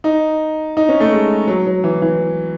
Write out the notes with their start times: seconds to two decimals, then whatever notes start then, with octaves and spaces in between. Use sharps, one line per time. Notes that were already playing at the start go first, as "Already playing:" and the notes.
0.04 D#4
0.77 D#4
0.89 C#4
1.00 A3
1.12 G#3
1.48 F#3
1.66 F#3
1.84 E3
2.02 E3